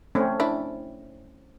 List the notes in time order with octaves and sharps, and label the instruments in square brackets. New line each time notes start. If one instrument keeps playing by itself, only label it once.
[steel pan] A3 C4 C#4
[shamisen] D4 E4